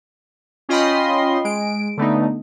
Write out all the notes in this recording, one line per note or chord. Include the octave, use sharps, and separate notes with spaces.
C#4 F4 D#5 G5 B5 C6
G#3 D7
D3 A3 B3 D#4